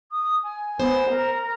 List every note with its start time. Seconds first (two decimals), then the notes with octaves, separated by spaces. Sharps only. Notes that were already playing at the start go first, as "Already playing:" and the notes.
0.11 D#6
0.43 G#5
0.80 B3 C5
1.10 A#4 A#5